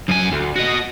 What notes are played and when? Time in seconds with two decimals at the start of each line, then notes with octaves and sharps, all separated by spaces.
0.08 F#2 G#5
0.32 D2
0.56 F#4 D#5